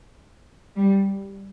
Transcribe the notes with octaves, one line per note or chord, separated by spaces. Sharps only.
G3